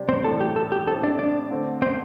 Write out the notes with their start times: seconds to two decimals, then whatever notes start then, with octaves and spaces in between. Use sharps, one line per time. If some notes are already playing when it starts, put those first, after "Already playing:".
Already playing: C3 G3 D4 G4
0.09 C4 C5
0.24 A2 E3 A3 D4 A4
0.41 G4
0.56 A4
0.72 G4
0.87 A2 A3 C4 G4 A4
1.03 D4 D5
1.19 D4 D5
1.51 D3 A3 C4
1.82 C4 C5